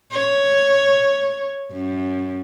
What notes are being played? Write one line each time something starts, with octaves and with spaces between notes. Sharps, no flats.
C#5
F#2